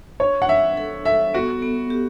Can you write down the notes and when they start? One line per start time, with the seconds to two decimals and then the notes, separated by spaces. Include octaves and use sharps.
0.20 D4 C#5
0.42 F#5
0.48 D4 E5
0.77 A4
1.05 A4 E5
1.34 B3 F#4
1.63 B3
1.90 G4